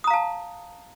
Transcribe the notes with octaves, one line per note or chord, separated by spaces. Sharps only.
F5 A5 A#5 D#6